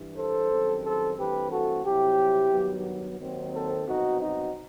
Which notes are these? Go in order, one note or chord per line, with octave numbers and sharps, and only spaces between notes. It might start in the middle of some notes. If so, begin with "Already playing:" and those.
Already playing: G2 E3 G3
A4 C5
F#2 D#3 G3 C4
A4 C5
G2 E3 A3 C4 G4 B4
F#4 A4
C2 C3 F#3 C4 E4 G4
G2 D#3 F#3 B3
D#2 D#3 F#3 C4
A4 C5
C2 B2 F#3 C4 D#4 F#4
D#4 F#4